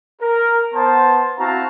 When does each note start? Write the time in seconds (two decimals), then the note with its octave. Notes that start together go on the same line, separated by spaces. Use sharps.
0.21 A#4
0.73 B3 C5 A5
1.38 C4 E4 F#4 F5 A5 A#5